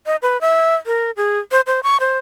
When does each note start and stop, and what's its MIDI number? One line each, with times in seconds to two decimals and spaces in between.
0.06 0.16 75
0.22 0.40 71
0.41 0.75 76
0.86 1.11 70
1.17 1.39 68
1.51 1.61 72
1.67 1.80 72
1.83 1.97 85
2.00 2.18 72